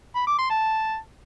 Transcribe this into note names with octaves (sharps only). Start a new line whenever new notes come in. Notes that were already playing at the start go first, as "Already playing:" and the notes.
B5
D6
C6
A5